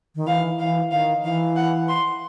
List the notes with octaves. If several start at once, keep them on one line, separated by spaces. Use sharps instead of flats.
D#3
E3 F5
E3 F5
D#3 F5
E3 F5
F#5
C6